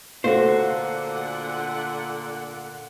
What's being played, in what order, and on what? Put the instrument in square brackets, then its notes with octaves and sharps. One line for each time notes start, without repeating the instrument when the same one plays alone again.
[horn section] A#2 D3 F#5 [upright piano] A3 F5 [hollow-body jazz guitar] F#4 C5